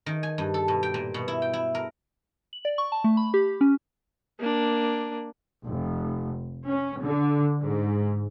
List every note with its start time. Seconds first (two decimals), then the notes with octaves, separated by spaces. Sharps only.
0.06 D#3
0.23 G#5
0.38 G2
0.54 A4
0.68 B2
0.83 G5
0.94 A#2
1.14 B2
1.28 E4
1.42 G5
1.53 E4
1.75 A#4
2.53 F#7
2.65 D5
2.78 C#6
2.92 A5
3.04 A3
3.17 B5
3.34 G4
3.61 C#4
4.39 A#3 D4
5.64 F1
6.67 C#4
7.01 D3
7.61 G#2